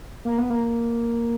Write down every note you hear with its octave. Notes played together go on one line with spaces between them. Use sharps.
A#3
B3
A#3